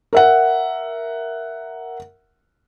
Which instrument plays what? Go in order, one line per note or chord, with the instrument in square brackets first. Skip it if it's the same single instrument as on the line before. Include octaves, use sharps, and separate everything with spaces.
[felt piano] A#4 E5 F#5